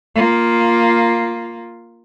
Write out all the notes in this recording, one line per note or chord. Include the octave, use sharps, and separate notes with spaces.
A#3 F4